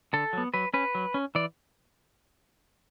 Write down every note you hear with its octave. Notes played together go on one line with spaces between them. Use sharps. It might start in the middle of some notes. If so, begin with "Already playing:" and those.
D3 A4
F#3 B3
F#3 B4
C#4 B4
F#3
C#4
E3 D5